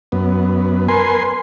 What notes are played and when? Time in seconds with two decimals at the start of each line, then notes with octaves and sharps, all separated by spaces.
0.12 F#2 B3
0.89 A#4 B4 G#5 C6